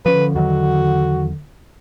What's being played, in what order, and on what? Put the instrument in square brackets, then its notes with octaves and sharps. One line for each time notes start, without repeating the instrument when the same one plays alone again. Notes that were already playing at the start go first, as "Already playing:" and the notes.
[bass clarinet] D3 [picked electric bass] F3 C#4 [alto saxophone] B4
[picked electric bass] E2 D#3 F#3 [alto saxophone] F#4